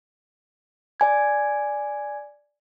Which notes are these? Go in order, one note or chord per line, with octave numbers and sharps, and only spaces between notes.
D5 G#5 G#6